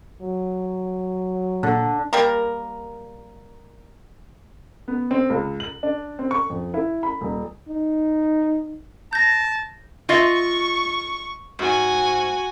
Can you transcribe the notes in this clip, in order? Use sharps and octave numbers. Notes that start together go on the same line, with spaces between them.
F#3
A#2 D3
G3 A#3 A#4
B3
C4
C#2
F#7
D4
C4
C#6
F2
E4
B5
D#1
D#4
A5 G6 A#6
F4 D#5 E5 C#6
G#2 F#4 G#5